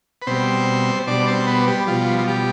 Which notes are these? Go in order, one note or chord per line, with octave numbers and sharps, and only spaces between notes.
B4
B2 G3 C4 C5
B2 G3 D4 D5
C4 C5
B3 B4
G3 G4
B2 F3 G3 F4
F4
G3 G4